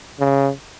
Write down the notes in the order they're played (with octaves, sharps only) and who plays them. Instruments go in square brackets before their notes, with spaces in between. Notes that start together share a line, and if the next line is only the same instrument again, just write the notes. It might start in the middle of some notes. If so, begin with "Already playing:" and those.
[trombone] C#3